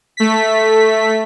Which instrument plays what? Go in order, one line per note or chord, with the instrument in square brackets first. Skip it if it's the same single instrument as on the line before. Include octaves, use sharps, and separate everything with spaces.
[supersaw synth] A3 B6